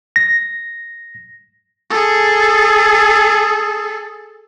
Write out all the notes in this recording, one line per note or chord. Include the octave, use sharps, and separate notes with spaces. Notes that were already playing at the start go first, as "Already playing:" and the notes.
A#6
G#4 A4